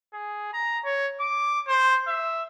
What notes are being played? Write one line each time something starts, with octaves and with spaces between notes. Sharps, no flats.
G#4
A#5
C#5
D6
C5
E5